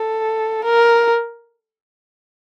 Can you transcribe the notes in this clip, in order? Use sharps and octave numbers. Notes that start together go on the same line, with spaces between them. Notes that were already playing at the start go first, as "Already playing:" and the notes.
Already playing: A4
A#4